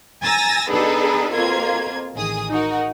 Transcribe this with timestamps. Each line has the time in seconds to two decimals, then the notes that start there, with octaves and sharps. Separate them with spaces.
0.22 G#5 A#5 E6 A6 A#6
0.69 B3 D4 D#4 G#4 A4 B4
1.32 F2 B2 A#3 F4 G#6
2.15 A1 D#3 G#4 D#6
2.50 D#4 F#4 A#4